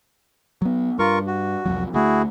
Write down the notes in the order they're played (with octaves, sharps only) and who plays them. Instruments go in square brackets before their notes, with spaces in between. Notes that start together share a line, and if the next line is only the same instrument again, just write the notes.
[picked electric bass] F#3 B3
[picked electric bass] G2 [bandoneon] F4 A#4 C#6
[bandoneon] F#4
[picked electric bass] C2 F2 F#3
[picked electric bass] D2 A3 [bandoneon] E4 F#4 G#4